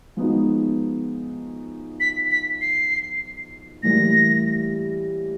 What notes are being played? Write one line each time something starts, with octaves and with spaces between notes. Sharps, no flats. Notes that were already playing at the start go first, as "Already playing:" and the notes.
F3 G#3 B3 D#4 F#4
B6
B6
C7
A2 E3 G3 A#3 A#6